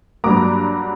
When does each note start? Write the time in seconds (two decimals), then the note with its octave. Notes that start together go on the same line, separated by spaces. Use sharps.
0.24 G2 F#3 A#3 A#5 D6